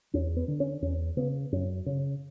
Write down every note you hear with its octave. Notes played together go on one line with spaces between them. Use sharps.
E2 C#4
B3
D3
C#4
E2 C#4
C#3 B3
F#2 C#4
C#3 C#4